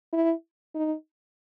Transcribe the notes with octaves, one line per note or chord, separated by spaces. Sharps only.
E4
D#4